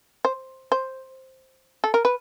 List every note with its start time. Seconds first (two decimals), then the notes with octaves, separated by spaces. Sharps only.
0.25 C5
0.72 C5
1.84 A4
1.94 A#4
2.05 B4